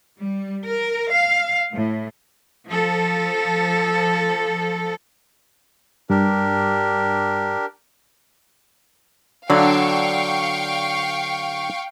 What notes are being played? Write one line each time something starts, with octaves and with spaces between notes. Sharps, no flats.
G3
A#4
F5
A2
F3 A4
G2 D4 G4 A#4
D3 F#3 D4 F5 G5 C#6